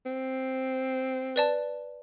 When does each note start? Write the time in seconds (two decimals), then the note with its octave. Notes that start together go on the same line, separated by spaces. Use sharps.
0.06 C4
1.36 B4 D5 A5